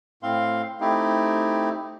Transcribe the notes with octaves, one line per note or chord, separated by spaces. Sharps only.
A2 C4 F5 C6
A3 C4 D#4 E4 G4